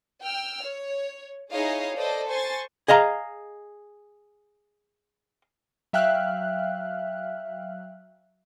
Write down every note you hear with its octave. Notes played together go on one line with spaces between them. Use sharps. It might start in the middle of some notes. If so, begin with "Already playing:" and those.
G5 E6 F6
C#5
D#4 E4 G#4 C#5 D#5 F5
A4 B4 C5 D5 D#5 A5
C5 G#5 C6 C#6 A6
G#4 D#5 F5 A#5
F#3 E5 F5 G5 F6 F#6